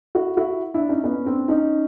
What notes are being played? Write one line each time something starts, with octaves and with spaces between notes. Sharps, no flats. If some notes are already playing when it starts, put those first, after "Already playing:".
E4 F#4
E4 F#4
D4 E4
C#4 D#4
B3 C#4
C4 D4
C#4 D#4